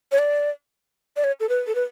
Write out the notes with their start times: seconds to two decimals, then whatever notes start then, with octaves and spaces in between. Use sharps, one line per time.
0.12 C#5
0.19 D5
1.16 D5
1.24 C#5
1.40 A4
1.49 B4
1.67 A4
1.75 B4